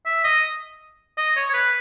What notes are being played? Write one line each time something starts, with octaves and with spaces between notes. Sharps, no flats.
E5
D#5
D#5
C#5
C#5
B4